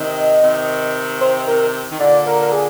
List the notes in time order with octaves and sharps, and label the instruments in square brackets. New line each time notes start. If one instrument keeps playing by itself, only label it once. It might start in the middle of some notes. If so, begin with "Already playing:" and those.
Already playing: [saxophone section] C3 D#3 [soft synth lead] D#5
[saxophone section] C3 D#3
[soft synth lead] C5
A#4
[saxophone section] D#3
[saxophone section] A#2 D3 [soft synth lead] D5
[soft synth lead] A#4
A#4
G#4